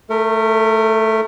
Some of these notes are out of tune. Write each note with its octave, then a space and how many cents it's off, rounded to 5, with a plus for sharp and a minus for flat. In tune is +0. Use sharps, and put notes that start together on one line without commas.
A3 +0 A#4 -35